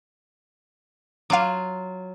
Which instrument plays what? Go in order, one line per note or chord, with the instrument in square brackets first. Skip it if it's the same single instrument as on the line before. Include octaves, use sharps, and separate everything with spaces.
[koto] F#3 F4 [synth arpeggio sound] F5 D6